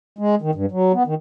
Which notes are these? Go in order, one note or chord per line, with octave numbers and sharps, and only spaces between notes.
G#3
D#3
G2
F#3
B3
D#3